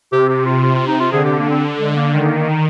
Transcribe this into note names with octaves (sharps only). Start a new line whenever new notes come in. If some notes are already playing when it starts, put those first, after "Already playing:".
C3 G4
G4
F4
F4
F4
D#4
F4
D3 G#4
G4
A#3
C4
G#3
A#3
D#3 G#3
A#3
A#3
D#4